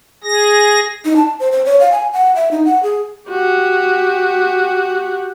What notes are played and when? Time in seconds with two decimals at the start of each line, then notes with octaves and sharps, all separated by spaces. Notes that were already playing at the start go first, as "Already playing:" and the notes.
0.24 G#4 A#6
1.04 D#4
1.16 A5
1.40 C5
1.52 C5
1.65 C#5
1.80 F5
1.92 G#5
2.13 F#5
2.36 E5
2.51 D#4
2.65 F#5
2.83 G#4
3.29 F#4 G4